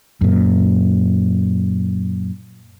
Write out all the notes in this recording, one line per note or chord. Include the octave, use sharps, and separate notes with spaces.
F#2 A#2